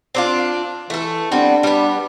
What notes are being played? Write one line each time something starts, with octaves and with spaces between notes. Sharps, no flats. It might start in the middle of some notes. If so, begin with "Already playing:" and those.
C4 D4 F4
E3 A3 A4
G3 B3 C4 D4
G3 B3